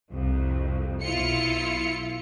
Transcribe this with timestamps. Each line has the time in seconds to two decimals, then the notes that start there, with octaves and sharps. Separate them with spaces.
0.10 C2 F2
1.02 B1 E4 F4 C#7